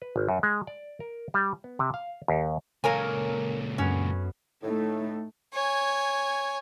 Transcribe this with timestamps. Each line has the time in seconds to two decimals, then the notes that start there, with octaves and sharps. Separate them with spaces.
0.02 B4
0.16 G#1
0.29 F#2
0.43 G#3
0.67 D5
1.00 A#4
1.34 G3
1.64 B3
1.79 C3
1.94 F5
2.28 D#2
2.84 C#2 A#2 A#3 A4 A#4 C#5 G#5
3.78 F#2 B3 C#4
4.63 A2 A3 D#4
5.54 C#5 G#5